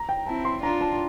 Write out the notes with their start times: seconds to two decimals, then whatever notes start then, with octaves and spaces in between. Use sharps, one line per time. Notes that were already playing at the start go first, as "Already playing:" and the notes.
Already playing: A#5
0.09 G5
0.26 C4 E4 A5
0.45 C6
0.62 D4 F4 A#5
0.81 A5